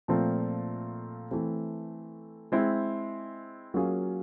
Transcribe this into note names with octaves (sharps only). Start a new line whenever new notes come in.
A#2 F3 A3 C4
E3 A3 C4
G#3 C4 E4
F#3 A#3 C#4 F4 G#4